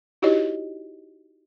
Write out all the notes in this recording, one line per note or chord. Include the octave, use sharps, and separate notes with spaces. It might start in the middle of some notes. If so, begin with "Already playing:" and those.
D#4 E4 F#4 G4 C#5 D#5